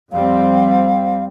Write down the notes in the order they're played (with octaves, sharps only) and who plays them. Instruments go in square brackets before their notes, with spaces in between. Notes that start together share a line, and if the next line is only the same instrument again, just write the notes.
[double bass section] F2 G3 C4 [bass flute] F5